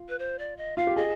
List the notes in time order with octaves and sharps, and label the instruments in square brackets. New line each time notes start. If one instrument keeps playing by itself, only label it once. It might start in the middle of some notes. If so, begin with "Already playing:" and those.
Already playing: [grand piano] F4
[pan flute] B4
C5
D5
D#5
[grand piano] F4 [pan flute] F5
[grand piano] G4
[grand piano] G#4 [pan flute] D#5